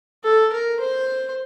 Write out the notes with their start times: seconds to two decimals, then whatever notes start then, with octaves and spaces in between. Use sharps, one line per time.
0.24 A4
0.53 A#4
0.80 C5